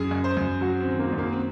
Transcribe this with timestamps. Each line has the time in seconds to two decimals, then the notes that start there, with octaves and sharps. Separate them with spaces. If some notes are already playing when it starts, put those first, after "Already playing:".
Already playing: F#2 G#4
0.11 F#2
0.24 C5
0.37 F#2
0.61 F#3 F#4
0.80 C4
0.87 D#3
0.99 A#3
1.13 F#2
1.18 A#3
1.33 C4